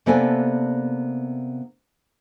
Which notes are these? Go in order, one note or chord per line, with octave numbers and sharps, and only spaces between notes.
C3 A#3 B3 D4 A4 G#5